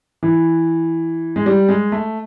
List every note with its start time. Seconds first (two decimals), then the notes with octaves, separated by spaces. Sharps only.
0.23 E3
1.36 G#3
1.46 G3
1.69 G#3
1.92 A3